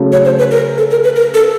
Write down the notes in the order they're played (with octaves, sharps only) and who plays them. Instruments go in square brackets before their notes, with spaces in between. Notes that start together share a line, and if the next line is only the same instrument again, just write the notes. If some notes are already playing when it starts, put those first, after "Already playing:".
Already playing: [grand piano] C#3 F#3 A3
[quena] C#5
C5
B4
A#4
A4
A#4
B4
A#4
A4